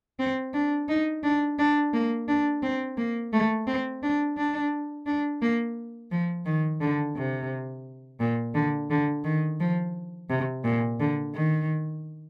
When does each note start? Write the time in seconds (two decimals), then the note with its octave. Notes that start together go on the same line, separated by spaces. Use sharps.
0.19 C4
0.54 D4
0.89 D#4
1.24 D4
1.59 D4
1.94 A#3
2.28 D4
2.63 C4
2.98 A#3
3.33 A3
3.67 C4
4.03 D4
4.38 D4
5.06 D4
5.42 A#3
6.11 F3
6.46 D#3
6.81 D3
7.16 C3
8.20 A#2
8.55 D3
8.90 D3
9.24 D#3
9.60 F3
10.30 C3
10.65 A#2
11.00 D3
11.35 D#3